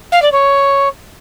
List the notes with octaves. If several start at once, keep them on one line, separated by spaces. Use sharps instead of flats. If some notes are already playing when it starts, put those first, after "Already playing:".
F5
D5
C#5